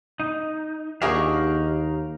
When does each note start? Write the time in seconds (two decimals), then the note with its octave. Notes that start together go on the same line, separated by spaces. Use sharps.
0.20 D#4
1.02 D#2 D4 D#4 F#4 G#4 A#4 F5